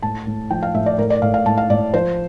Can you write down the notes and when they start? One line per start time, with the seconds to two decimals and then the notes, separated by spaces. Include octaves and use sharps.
0.03 A2 A5
0.27 A2
0.50 F3 G5
0.63 F5
0.74 A2 E5
0.86 D5
0.98 A2 A#4
1.10 D5
1.22 A2 F5
1.34 F5
1.46 A2 A5
1.58 F5
1.70 A2 D5
1.94 F3 C5